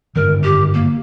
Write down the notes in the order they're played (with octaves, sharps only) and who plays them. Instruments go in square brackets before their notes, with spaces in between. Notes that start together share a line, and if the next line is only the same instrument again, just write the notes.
[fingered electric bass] G2 D3 D#3 [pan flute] A#4
[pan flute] G4
A#3